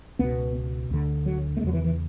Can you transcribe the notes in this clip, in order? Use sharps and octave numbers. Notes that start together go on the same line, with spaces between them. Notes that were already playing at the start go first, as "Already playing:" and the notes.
C#2 B2 B3
D2 D3
F#3
A3
E2 C#3 F#3 G#3
E3
E3